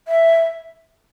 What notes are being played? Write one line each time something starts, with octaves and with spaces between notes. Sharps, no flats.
E5